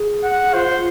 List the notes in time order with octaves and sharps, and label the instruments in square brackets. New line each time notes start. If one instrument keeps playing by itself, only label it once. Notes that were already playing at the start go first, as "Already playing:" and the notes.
Already playing: [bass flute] G#4
[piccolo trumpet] F#5
[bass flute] F4 [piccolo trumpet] C5